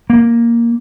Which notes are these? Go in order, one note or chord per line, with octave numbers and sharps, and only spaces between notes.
A#3